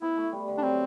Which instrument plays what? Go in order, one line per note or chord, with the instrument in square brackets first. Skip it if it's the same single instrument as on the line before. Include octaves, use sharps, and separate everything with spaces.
[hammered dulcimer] B3 [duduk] E4
[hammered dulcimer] A3
G3
D3
[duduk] D4
[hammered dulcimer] F#3 [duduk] C4